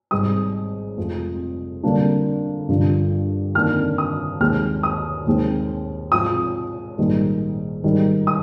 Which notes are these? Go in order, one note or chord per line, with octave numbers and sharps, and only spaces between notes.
G#1 G#2 G3 D#6
F1 F2 C3 F3
F2 D3 G3 A#3 D4
G2 D3 F3
F2 D#3 A#3 D4 F6
D#6
D#2 D#3 G#3 C4 F6
D#6
D#2 D#3 G#3 C4
G#2 F3 C4 D#6
A#1 G#2 D#3 G3
G#2 D#3 G3
D#6